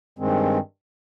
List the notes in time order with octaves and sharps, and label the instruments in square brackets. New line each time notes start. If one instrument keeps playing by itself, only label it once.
[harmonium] G2 D#3 G#3 C4